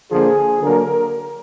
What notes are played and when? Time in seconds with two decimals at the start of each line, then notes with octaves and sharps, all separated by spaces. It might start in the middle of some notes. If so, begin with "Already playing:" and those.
0.10 D3 F3 A#3 G#4
0.62 D3 F#3 A#3 A#4